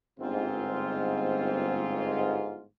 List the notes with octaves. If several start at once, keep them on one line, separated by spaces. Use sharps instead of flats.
G1 G#2 C4 F4